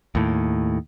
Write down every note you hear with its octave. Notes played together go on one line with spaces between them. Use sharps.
D#2 A2